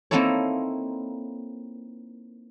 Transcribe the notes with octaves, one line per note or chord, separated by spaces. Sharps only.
A#3 C4 D#4 E4 A4 C#5